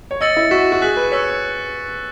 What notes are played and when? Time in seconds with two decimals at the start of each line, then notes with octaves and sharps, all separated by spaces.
0.11 C#5
0.21 D#5 E6 A6 C#7 F#7
0.36 E4
0.51 F#4 C#6 E6 B6 E7
0.72 F#4
0.82 G#4 F#6 B6 F#7
0.97 B4
1.12 C#5 C#6 E6 B6